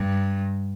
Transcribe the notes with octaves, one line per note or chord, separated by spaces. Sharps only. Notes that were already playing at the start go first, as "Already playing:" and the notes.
Already playing: G2